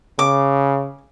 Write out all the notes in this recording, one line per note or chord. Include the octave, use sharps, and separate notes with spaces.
C#3 D6